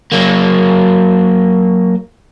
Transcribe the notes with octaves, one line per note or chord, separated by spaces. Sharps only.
F#3 A#3